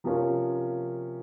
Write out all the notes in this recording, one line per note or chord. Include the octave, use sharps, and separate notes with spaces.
C3 F3 A#3 C#4